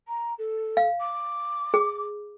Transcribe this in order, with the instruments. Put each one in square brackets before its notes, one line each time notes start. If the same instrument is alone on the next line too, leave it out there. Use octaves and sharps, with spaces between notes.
[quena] A#5
A4
[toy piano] F5
[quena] D6
[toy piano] G#4